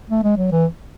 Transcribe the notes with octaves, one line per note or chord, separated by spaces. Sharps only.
A3
G#3
F#3
E3